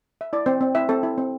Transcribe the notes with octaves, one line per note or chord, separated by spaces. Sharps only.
E5
E4 D5
C4 C5
C4
E4 E5
C4 A4
E4
C4